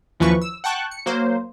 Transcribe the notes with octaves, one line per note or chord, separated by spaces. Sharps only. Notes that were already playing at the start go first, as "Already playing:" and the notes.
D#2 E3 F3 C#4 B4 C#6
E6
F#5 G5 A5 C#6 F#6
C#7
F#3 A#3 C5